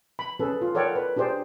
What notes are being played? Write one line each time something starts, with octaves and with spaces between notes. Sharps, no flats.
B5
C#4 G#4 A4 B4
F4
A4 A#4 C#5 D5 F#5 G5
B4
D4 G4 G#4 C5 D5